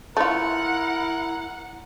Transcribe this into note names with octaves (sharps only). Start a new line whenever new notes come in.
A3 E4 F4 A#4 F#5